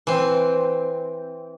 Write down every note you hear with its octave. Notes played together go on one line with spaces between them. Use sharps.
E3 C4